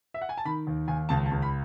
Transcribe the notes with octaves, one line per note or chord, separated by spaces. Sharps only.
E5
F#5
G#5
A5
D#3 B5
D#2
D#2 G#5
C#2 A5
A5
C#2
B5